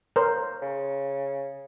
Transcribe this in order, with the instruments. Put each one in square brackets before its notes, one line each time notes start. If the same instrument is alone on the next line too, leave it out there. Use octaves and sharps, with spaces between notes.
[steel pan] A#4 C5 C#5
[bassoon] C#3